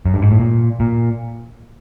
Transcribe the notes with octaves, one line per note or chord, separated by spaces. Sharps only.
F#2
G2
G#2
A2
A#2
A#2